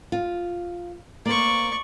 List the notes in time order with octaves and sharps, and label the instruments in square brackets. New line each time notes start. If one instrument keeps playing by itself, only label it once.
[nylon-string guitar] F4
[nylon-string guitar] A#3 C5 [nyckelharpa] D5 C#6